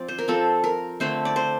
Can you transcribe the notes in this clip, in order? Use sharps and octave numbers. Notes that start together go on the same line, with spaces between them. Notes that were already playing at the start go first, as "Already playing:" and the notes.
Already playing: F3 C4 D5
C5
A#4
F3 C4 A4
A#4
D3 A3 C4 C5
D5
C5